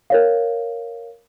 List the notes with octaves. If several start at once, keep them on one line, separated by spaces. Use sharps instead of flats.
A#4 C#5 F5